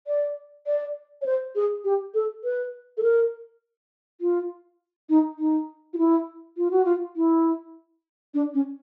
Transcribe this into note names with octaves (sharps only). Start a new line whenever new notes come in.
D5
D5
C#5
C5
G#4
G4
A4
B4
A4
A#4
F4
D#4
D#4
F4
E4
F4
F#4
F4
E4
D4
C#4